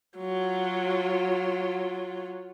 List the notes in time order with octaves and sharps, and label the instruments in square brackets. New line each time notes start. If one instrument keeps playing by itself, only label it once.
[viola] F#3 F4